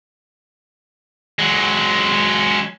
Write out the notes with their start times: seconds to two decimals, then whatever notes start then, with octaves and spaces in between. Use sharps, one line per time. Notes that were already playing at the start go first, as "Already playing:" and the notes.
1.39 F#3 G#3